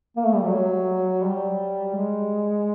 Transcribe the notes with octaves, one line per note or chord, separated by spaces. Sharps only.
A#3
A3
G3
F#3
G3
G#3